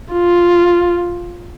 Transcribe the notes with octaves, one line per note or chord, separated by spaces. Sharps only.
F4